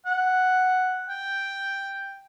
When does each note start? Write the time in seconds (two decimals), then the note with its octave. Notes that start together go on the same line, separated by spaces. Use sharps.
0.06 F#5
1.09 G5